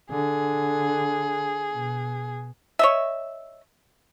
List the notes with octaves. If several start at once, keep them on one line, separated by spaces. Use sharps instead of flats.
D3 G#4
B2
C#5 D#5 E5